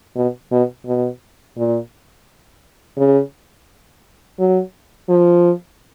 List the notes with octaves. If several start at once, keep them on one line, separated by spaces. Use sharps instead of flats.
B2
B2
B2
A#2
C#3
F#3
F3